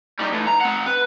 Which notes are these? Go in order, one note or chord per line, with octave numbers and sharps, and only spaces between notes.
G3 D#4
E3 A3
A#5
C4 F#5
B4